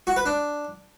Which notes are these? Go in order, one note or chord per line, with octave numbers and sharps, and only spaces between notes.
F#4
B4
D4